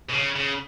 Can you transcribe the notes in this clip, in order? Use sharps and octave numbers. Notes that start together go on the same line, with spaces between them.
B2
C#3
C#3